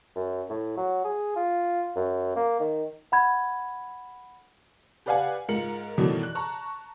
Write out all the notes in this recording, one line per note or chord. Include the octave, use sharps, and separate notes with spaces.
F#2
A2
F#3
G#4
F4
F#2
A#3
D#3
F#5 B5 G#6
G4 B4 D5 F5 F#5 G#5
G#2 F4 A#4 C#7 F#7
G2 B2 D#3 E3 F#3 A3
F#6
A5 A#5 C#6